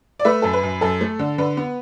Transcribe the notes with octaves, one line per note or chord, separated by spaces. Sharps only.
D5
A3 B4 E5
F#2 A4
B4
F#2
F#2 A4
A3
D3
D3 B4
B3